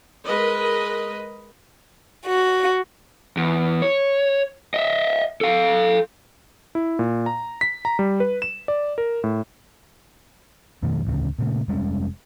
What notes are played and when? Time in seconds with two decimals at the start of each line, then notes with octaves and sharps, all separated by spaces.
0.25 G#3 A#4 B4 D#5
2.26 F#4
3.37 E2
3.82 C#5
4.74 D#5 E5
5.41 A4 F5
6.75 E4
6.99 A#2
7.26 A#5
7.61 B6
7.85 A#5
7.99 G3
8.20 B4
8.42 E7
8.68 D5
8.98 A#4
9.24 A2
10.82 F2 B2 D#3 A3
11.05 A1 D2 C#3
11.39 A#2 C#3 A3
11.68 F1 G3 G#3 C#4